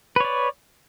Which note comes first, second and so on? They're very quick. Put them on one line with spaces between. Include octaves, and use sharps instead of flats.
B4 C#5 D5